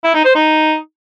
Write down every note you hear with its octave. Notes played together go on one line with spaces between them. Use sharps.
E4
D#4
C5
D#4